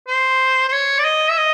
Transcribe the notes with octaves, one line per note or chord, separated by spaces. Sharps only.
C5
C5
C#5
D5
D#5
E5
D#5